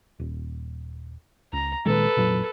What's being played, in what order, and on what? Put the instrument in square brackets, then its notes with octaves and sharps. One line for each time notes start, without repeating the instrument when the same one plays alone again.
[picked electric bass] D#1
[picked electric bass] C#2 [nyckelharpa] A#5
[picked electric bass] A#2 D#3 G#3 [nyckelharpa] A4 B4
[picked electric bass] F1 A#2 F#3